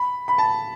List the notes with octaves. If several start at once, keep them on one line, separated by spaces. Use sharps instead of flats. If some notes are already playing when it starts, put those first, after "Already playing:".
Already playing: B5
B5
A5